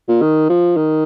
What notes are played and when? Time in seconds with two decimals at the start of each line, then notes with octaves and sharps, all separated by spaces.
0.08 A#2
0.22 D#3
0.49 F3
0.76 D#3